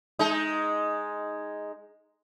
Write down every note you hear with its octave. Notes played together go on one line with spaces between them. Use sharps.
G#3 D#4